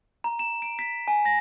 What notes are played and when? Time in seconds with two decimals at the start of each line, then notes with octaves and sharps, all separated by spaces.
0.24 A#5
0.39 E7
0.62 D7
0.79 B6
1.08 G#5
1.25 A#6